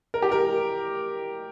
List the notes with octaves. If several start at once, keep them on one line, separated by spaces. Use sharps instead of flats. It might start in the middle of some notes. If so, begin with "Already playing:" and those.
A#4
G4
A#4